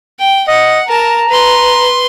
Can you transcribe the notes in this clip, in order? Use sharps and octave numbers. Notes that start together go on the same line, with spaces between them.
G5
D#5 F#5
A#4 A5 A#5
B4 C6